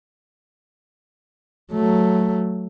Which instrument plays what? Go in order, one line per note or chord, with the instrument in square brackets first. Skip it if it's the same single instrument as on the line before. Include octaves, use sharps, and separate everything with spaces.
[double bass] F#3 A3